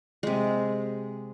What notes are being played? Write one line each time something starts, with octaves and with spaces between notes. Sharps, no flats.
C3 G#3